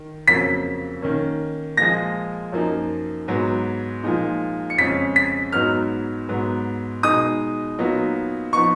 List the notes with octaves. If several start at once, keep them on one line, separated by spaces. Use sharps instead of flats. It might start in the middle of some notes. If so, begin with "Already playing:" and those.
Already playing: D#3
F2 C#3 F#3 A#3 B6
D#3 A#3 C#4
A#2 F3 G#3 A#6
F#2 F3 A#3 D#4
G#2 F#3 B3
A#2 F3 G#3 D#4
C#7
F2 C#3 G#3 C#4 B6
B6
G#2 F#3 B3 D#4 F6
G#2 F#3 B3
B2 G#3 D#4 D#6
A#2 F#3 B3 D#4
F3 B3 D#4 C#6